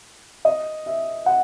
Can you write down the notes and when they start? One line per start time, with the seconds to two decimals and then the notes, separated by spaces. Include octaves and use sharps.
0.45 D#5
0.86 E5
1.26 F#5